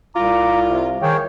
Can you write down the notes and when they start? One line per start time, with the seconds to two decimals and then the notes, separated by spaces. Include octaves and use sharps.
0.16 C2 F4 A#5 D6
0.67 C3
1.02 D#3 G#4 C#5 G5